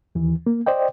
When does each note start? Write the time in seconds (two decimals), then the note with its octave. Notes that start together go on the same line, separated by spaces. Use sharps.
0.15 D#2 E3
0.47 A#3
0.66 C5 D5 D#5 G5